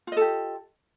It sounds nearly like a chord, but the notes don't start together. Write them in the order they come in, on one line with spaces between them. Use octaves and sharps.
F4 D#5 A4 G4